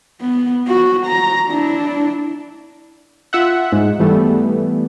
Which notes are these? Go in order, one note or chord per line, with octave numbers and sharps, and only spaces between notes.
B3
F#4
A#5
D4 E4
F4 E5 F#5
G#2
E3 G3 A3 B3